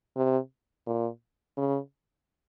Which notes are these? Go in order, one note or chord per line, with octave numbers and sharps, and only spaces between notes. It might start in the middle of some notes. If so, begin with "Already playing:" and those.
C3
A#2
C#3